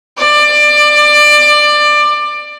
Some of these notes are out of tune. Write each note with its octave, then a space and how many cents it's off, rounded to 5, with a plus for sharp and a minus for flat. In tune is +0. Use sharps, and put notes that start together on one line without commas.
D5 +20